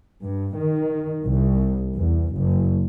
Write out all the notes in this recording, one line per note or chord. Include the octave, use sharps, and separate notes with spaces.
G2
D#3
C2
E2
F#1